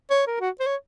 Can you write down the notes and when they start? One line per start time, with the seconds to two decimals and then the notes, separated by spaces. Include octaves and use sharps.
0.10 C#5
0.27 A#4
0.40 F#4
0.60 C5
0.66 C#5